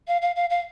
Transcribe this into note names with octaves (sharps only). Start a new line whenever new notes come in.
F5
F5
F5
F5